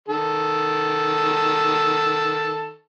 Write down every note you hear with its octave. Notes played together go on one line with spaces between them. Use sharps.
D#3 A4